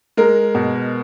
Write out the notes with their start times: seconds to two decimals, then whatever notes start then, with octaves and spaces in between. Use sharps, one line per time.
0.17 G#3 A#4
0.55 B2